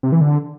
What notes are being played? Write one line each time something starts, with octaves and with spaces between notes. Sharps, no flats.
C3
E3
D3